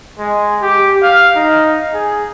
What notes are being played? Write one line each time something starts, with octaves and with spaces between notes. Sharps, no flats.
G#3
G4
F5
D#4
G#4